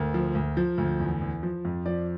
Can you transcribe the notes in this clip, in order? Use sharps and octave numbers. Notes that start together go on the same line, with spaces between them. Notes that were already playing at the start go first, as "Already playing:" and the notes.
Already playing: D2 A#4
F3
D2
F3
D2
E2
E2
F3
F2
F3 D5